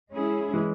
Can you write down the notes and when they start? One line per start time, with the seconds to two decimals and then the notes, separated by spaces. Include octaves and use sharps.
0.11 G#3 C#4 E4 G#4
0.54 E3 G#3